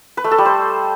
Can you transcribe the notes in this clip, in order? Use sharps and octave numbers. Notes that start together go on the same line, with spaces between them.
B4
A3
A4
G3
C5